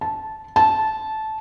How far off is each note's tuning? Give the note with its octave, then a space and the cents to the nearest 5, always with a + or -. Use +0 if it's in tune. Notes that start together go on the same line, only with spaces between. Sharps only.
A5 -15
A5 -15